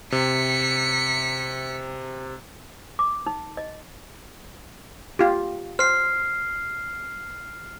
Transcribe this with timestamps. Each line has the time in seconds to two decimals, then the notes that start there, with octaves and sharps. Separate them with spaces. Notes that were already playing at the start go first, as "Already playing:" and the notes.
0.12 C3 B6 C#7
2.99 D6
3.26 D#4
3.57 D#5
5.19 F4 G4
5.79 C5 F6 C7